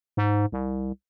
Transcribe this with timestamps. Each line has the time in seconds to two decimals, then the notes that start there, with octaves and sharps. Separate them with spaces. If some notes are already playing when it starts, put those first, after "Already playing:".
0.17 G#2
0.52 C2